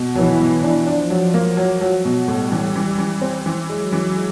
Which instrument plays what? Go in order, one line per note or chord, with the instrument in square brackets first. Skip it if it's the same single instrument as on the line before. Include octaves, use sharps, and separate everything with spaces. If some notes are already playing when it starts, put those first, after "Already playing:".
Already playing: [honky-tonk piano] B2
[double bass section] E3 [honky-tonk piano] F#3
[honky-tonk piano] B2
D4
[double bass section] F3 [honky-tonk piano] D4
[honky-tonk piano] F#3
A#3
F#3
F#3
B2
[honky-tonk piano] A2 [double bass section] G3
[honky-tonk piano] E3
E3
E3
C4
E3
[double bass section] F#3 [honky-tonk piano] G#3
[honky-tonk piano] E3
G#3